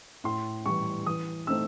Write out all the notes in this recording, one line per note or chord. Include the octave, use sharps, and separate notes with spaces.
A2 C6
E3 G3 C#6
E3 D#6
A3 C4 D#4 E6